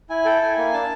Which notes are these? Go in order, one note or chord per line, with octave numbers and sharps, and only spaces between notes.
E4 G#5
A4 G5
E4 G#5
A#3
D4 A5